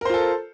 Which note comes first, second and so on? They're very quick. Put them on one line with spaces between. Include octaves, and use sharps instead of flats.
A#4 C5 F4 A4